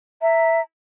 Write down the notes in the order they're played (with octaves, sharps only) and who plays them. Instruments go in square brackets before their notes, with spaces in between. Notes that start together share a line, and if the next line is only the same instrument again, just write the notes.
[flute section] E5 A#5